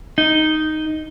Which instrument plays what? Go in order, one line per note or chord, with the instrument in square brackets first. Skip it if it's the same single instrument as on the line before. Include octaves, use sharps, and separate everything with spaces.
[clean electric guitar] D#4